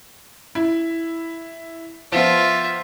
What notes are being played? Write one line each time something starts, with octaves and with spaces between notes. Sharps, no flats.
E4
F3 B3 F4 E5